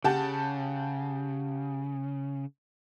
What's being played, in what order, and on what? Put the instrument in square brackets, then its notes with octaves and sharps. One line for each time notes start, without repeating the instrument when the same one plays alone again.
[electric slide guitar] C#3 [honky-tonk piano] G4 F#5 A5